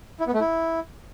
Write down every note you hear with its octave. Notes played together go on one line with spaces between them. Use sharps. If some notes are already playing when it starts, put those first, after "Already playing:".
E4
B3
A3
E4